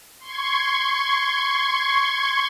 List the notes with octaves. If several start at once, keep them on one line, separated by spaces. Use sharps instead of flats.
C6 C#6 G#6